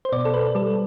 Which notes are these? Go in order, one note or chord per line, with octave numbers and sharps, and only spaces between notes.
C5
B2 D5
A4
B4
G3 A4